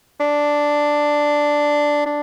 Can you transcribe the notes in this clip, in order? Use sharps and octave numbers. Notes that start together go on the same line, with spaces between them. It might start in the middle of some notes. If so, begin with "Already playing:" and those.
D4
D4